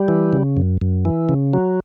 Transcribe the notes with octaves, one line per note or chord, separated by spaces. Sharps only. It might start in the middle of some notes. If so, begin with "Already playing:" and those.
Already playing: G3
E3
C#3
F#2
F#2
E3
C#3
F#3